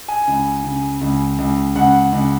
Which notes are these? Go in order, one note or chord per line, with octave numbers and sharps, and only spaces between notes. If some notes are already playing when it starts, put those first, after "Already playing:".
G#5
C#2
C#3
C#2
C#2
C#2 F#5
C#2